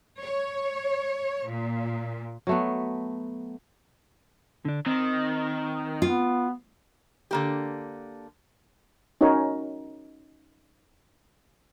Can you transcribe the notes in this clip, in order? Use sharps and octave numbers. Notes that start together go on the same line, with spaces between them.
C#5
A#2
F#3 A3 B3
D3 D4
D#3 C4
B3 F4
D3 A#3 G4
C#4 D#4 F#4 A#4 C#5